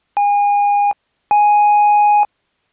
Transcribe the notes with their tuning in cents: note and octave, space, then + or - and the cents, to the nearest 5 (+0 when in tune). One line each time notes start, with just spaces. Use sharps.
G#5 -30
G#5 +0